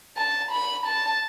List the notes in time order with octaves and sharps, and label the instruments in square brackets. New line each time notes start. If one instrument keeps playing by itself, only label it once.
[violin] A5
B5
A5